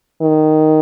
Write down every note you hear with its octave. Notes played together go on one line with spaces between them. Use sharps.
D#3